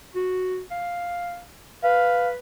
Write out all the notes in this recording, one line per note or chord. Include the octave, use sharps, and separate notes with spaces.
F#4
F5
B4 F5